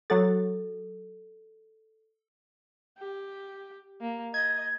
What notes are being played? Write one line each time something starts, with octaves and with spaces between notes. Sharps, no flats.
F#3 A4 F#5 A6
G4
A#3
D#5 G#6